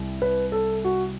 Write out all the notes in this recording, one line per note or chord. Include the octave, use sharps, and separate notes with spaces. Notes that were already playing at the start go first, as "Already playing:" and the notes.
Already playing: C2 G3
B4
A4
F#4